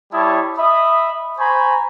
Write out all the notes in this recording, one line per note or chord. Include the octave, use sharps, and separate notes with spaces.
G3 E4 C#5 A5 D#6
D#5 E5 B5 D#6
C5 G#5 A#5 B5 C#6